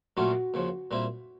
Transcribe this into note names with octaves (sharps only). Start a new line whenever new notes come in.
A#2 F#3 A3 C#4 F4 F#4
D#2 C#3 F3
A#2 G3 C4 E4